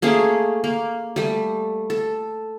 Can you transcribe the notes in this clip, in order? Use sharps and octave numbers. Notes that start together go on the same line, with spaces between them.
A3 A#3 C#4 G#4
A#3
G3 A3
A4